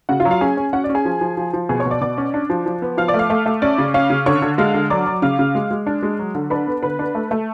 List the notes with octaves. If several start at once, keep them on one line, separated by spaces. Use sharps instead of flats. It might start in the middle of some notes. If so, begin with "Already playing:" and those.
C#3 F#4 F#5
F4 F5
F#3
F4 F5
C#4 G#4 G#5
C#4
C#4 F#4 F#5
D5
C#4
G#4 G#5
F3
F3
F3
F3
B2 G#4 G#5
C#5 C#6
B2
D5 D6
B2 D5 D6
C#4
D4
F3
F3
B3
F3 F5 F6
D5 D6
A3
F5 F6
A3
A3
C#4 D5 D6
C#3
C#4 F5 F6
C#3
D3 C#5 C#6
D3
G#3 F5 F6
D3
F#3 D5 D6
F#3
C#3 F5 F6
C#3
G#3
G#3
D4
G#3
F#3
D3
D4 B4 B5
B3
D3 B4 B5
D4
A3
A3